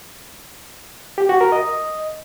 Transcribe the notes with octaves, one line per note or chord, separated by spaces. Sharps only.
G4
F#4
A#4
D#5